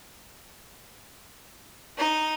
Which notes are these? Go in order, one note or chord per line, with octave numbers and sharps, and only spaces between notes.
D#4